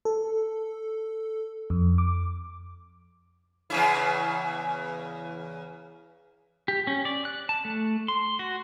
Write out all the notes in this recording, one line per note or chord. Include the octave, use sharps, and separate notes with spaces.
A4
F2
D6
E2 C#3 E4
G4
C#4
D5
F#6
A5
A3
C6
F#4